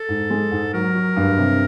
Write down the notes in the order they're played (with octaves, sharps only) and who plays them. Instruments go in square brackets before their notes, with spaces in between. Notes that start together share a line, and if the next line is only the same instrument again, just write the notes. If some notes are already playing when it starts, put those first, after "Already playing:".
Already playing: [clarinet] A4
[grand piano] G#2
G#3
G#2
[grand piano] F#3 [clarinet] A#4
[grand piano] F#3
G2
C3